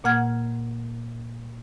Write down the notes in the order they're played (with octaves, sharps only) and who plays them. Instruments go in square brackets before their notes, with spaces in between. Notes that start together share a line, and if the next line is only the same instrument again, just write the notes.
[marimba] A#2 A#3 F#5 F6 G#6